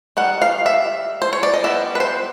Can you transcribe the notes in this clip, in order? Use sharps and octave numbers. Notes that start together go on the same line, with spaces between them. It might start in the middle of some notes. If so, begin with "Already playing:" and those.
D#3 G3 F#5
F5
E5
C5
C#5
D5
D#5
G3 B3 E4 E5
B4
C5